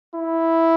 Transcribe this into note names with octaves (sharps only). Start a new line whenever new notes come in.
E4